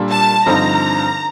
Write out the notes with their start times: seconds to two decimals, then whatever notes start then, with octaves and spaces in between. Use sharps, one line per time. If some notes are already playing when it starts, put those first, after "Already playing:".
Already playing: A#2 G3 A#3 D4 A4
0.11 A5
0.46 G2 D3 F3 C4 D#4 A#5